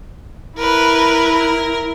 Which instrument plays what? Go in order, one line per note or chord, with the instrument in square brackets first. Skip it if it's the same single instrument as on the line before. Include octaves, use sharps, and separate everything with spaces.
[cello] E4 [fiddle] A#4 B4
[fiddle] A#4